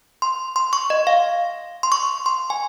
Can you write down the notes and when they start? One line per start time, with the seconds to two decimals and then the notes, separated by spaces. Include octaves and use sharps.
0.22 C6
0.56 C6
0.73 C#6
0.90 D#5
1.07 F5
1.83 C6
1.92 C#6
2.26 C6
2.50 G#5